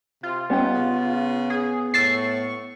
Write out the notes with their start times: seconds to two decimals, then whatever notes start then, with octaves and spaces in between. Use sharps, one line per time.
0.23 C3 F4
0.50 G3 B3 C#4 D#4 G4
0.73 C#3
1.50 G#4
1.94 A2 C#6 E6 A6 C7